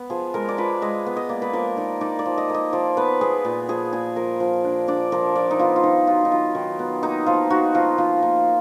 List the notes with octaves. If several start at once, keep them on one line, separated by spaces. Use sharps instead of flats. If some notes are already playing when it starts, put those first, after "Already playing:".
Already playing: B3
F3 G#4
G#3 A#4
D5
F3 B4
G#3 D#5
B3
D#5
A#3 D5
B4
F3 A#4
D#4 D5
D#4 D5
D5
F3
D#5
A#3 D#5
F3 D5
B3 B4
B3 G#4
A#2
F3 G#4
A#2 G#4
F3 A#4
F3
D4
D4 D5
F3 A#4
F3 D5
D#4
B3 F4
F4
D#3 D#4
F#3 F4
D#4
F#3 F4
D#3
B3
A#3 D#4
F3 F4
D#4 F#4
F3 F4
F3 F4
A#3 D#4